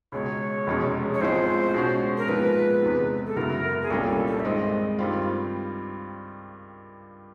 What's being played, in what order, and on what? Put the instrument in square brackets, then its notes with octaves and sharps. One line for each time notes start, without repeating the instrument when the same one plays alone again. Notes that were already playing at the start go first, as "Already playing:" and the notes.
[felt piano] C#2 B2 G#3 [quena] C#5
[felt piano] F1 E2 B2 G#3 C#4
[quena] C#5
[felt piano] B1 A2 F3 G#3 C4 [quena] C5
[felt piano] B2 G#3 C#4 F#4
[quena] A#4
[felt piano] A#1 G#2 F3 G#3 B3 [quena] B4
[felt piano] E2 C3 D#3 G#3 B3
[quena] A4
[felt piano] F#2 C#3 F#3 B3 E4 [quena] A#4
[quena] G#4
[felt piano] C2 A#2 G3 A#3 C#4 [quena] A4
[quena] A4
A4
E5
[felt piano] G2 D#3 G#3 C4 [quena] D#5
[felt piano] G2 D#3 G3 C4 F4